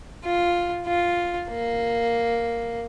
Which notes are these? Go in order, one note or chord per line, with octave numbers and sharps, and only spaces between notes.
F4
F4
A#3